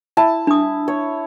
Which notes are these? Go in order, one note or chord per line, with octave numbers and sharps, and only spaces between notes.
E4 A5
D4 D#6
C#5